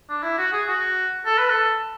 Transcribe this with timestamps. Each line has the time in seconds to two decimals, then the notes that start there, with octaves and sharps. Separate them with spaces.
0.09 D4
0.23 E4
0.38 F#4
0.52 G#4
0.68 F#4
1.26 A4
1.38 B4
1.50 A4